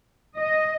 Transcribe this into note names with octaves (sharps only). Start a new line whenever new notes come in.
D#5